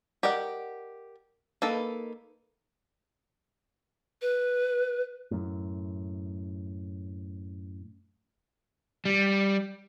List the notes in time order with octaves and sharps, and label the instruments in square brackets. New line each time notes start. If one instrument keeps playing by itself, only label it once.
[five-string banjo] G4 A#4 D5 D#5 F#5
A#3 D#4 A4 B4
[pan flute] B4
[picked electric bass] F#2 A2
[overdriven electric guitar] G3